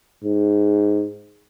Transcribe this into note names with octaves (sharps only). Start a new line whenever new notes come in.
G#2